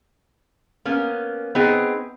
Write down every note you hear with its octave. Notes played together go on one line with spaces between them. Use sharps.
A#3 B3 C#4
B3 C4 D#4 G#4 D#5